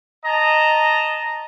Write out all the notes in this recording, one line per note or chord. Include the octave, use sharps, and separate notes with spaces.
D#5 A5 A#5